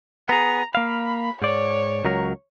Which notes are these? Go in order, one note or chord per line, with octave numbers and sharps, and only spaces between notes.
B3 G#4 A#5
A#3 F5 B5
G#2 C#5 D5
C#2 F#3 A#4